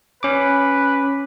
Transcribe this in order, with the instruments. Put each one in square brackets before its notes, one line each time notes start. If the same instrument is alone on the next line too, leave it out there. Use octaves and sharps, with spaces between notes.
[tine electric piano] C#4 D6 [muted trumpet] B4